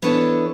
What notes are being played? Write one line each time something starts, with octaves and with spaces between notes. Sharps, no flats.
E3 B3 D4 A4 C#5